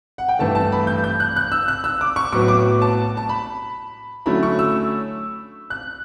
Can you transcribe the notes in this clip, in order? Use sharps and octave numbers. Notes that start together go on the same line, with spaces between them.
F#5
G5
G2 E3 A3 A5
A5
B5
G6
G6
F#6
F#6
E6
F#6
E6
D6
C#6
A2 F#3 B3 C#6
D6
A5
A5
B5
D3 F#3 A3 C#4 E4 B5
C#6
E6
F#6